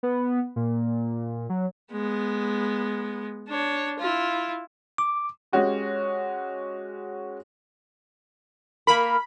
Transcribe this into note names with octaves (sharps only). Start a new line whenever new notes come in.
B3
A#2
F#3
G#3 B3
D4 C#5
E4 F4
D6
G#3 C#4 F#4 G4
A#3 A#4 B5